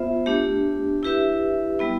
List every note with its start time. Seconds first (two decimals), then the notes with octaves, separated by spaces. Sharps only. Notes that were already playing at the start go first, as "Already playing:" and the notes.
Already playing: B3 F4 C5 E5
0.26 A3 D4 G4
1.03 E4 G4 B4 E5
1.79 G3 B3 E4